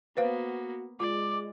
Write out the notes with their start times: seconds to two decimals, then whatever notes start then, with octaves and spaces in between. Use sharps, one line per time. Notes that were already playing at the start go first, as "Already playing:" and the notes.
0.17 A#3 B3 F#4 B4 C5 F5
1.00 G#3 F4 D5 D6